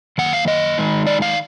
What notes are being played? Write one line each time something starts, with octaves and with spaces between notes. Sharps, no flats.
F#2 D#3 A#3 F#5
F5
D#5
D#3 G#3 D#4
D5
F5